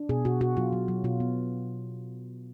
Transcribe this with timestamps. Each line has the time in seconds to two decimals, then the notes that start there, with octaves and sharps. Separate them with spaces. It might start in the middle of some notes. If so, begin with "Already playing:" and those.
Already playing: D4
0.09 B2 G#4
0.25 B2 F#4
0.40 B2 F#4
0.57 F#3 F4
0.73 F#3
0.88 F#3
1.04 B2 F4
1.20 B3